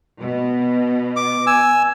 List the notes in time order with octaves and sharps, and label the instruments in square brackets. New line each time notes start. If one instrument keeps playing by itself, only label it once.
[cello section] B2
[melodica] D6
G#5 E6